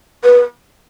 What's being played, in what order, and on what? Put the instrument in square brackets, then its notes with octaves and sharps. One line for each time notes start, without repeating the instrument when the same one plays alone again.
[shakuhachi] B4